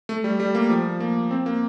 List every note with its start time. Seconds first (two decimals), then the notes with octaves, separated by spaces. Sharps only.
0.09 A3
0.24 G3
0.40 G3
0.55 A#3
0.70 F3
1.00 A#3
1.31 C4
1.46 A#3